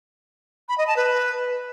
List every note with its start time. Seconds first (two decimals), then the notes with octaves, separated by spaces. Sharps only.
0.69 B5
0.78 D#5
0.87 A5
0.97 B4